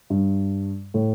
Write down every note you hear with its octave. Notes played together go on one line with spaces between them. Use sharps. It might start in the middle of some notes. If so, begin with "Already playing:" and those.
G2
A2